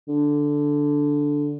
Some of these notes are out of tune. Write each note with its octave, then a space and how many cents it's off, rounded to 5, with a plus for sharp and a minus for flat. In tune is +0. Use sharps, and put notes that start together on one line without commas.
D3 -5